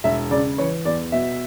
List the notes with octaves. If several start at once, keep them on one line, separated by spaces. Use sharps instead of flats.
E1 E5
C#3 D5
E3 C#5
E2 D5
B2 E5